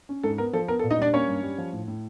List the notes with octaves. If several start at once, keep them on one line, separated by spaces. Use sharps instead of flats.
C#4
G#2 A4
B3 A#4
F3 A4
B3 A#4
A4
A#2
D#4 D#5
G3 D4 D5
A#3 C#4 C#5
G2
G3
F3
A2
A2